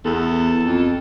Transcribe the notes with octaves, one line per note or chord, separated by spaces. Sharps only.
E2 A4
F2